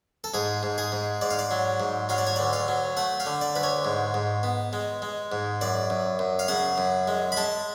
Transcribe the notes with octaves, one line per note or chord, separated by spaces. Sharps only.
A4
G#2 G#4
G#2
G#4
G#2
G#2 D5
F5
D5
F#3
G#2
F#3 F5
D5
C#5
D2 D5
F5
F#3
A3 F#5
F5
D3
D5
D2 B4
C#5
G#2
G#2
B3
G#3
G#3
G#2
F#2 D5
F#2
F#2
F5
C#3 F#5
F#2
G#3
B5
G#3 A5